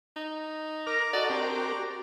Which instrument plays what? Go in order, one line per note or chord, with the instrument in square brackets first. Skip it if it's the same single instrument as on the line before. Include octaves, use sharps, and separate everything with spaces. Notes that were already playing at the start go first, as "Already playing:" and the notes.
[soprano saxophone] D#4
[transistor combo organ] A#4 F6 [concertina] A#5 D6 [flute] A#6
[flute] F#4 [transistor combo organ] A4 D#5 F#5 [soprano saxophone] D5
[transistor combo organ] C4 G4 A#4 [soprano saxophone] D4